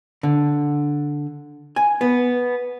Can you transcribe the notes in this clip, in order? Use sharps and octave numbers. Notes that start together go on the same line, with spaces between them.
D3
G#5
B3